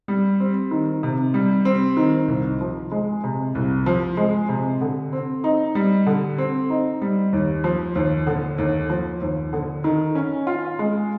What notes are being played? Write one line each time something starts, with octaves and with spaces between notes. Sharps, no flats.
G3
C4
D#3
C3
G3
C4
D#3
C2
F3
G#3
C3
C2
F3
G#3
C3
D3
C4
D#4
G3
D3
C4
D#4
G3
D#2
F3
D#2
D3
D#2
F3
D#2
D3
D#3
C#4
F4
G#3